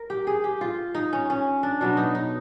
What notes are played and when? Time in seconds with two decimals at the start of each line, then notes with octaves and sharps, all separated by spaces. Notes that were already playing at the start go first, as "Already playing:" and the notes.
Already playing: A#4
0.10 G4
0.27 G#4
0.44 G4
0.61 F4
0.95 D#4
1.13 C#4
1.30 C#4
1.63 D4
1.81 B2 F#3 B3 D4
1.97 D#4
2.15 D#4